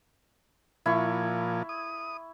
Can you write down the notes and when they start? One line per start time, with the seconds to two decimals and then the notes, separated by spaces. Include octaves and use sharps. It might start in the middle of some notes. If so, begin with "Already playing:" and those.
0.86 A#2 F3 E4 C#6
1.69 D#6